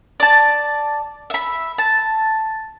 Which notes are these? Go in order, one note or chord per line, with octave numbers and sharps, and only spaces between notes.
D5 A5
E5 B5
A5